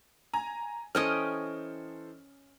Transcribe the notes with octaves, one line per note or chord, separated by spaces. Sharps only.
G#5 A#5
E3 C#4 A4 C5 D#5 G5 D#6 F6